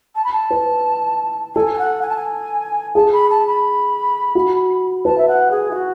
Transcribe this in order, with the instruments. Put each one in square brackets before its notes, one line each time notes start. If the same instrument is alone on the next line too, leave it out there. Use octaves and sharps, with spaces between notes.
[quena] A5
B5
A5
[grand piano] B4
[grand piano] A4 [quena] G#5
[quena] G#5
F#5
G#5
A5
G#5
[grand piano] G#4 [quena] A5
[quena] B5
A5
B5
[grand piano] F#4
[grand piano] B4 [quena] A5
[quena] E5
F#5
G#4
E4
F#4